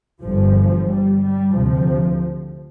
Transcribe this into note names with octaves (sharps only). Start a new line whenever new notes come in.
G1 G2 F3
G3
G3
D2 C3 F3